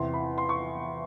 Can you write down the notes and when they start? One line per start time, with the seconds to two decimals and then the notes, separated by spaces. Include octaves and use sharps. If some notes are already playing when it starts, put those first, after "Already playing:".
Already playing: E2 C3 E3 C6
0.14 B5
0.38 C6
0.49 C#6